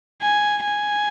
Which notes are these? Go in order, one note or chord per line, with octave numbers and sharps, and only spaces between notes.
G#5
G#5